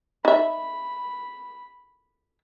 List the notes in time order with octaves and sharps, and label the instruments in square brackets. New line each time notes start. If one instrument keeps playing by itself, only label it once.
[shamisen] D#4 E5 [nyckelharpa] B5